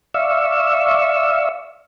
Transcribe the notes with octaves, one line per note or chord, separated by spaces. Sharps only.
D5 E5 F5 C#6 E6